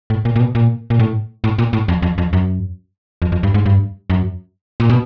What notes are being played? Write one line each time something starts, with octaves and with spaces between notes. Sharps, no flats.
A2
A#2
A#2
B2
A#2
A#2
A2
A2
A#2
A2
F2
F2
F2
F#2
F2
F2
G2
G#2
G2
F#2
A#2
B2